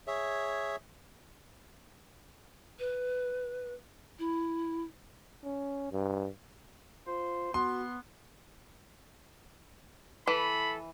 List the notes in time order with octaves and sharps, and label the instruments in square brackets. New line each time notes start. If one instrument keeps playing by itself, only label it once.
[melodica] G#4 C#5 E5
[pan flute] B4
E4
[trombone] C#4
G2
[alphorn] F4 [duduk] C5
[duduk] B3 [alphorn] F#4 [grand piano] C6
[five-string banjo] E3 [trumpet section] A4 B5